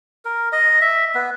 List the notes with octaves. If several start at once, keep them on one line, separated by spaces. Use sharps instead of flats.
A#4
D#5
E5
B3